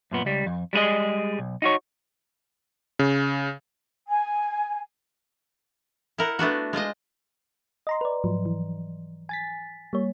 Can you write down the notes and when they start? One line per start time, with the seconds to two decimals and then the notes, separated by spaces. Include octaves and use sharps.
0.11 F#2 A#2 B3
0.25 C#2 G3
0.46 F2
0.73 G3 G#3 D#4 G#4 D#5
1.39 B1
1.62 D#4 F#4 C#5
2.99 C#3
4.09 G#5
6.18 E4 A#4 F#5
6.39 A3 B3 D4 F#4
6.73 G#3 F4 C5 D#5
7.87 D#5 A#5 C6
8.01 B4 D5
8.24 G#2 F3 F#3
8.46 E3
9.29 G#5 A6 B6
9.93 G3 A#3 C#5